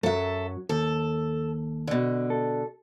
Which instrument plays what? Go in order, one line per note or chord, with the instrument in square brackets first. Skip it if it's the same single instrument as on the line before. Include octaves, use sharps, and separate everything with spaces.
[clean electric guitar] F#2 F#3 [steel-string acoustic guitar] A4 E5
[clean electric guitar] D#2 [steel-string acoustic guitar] A4
[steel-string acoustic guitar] B2 D3
[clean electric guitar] A4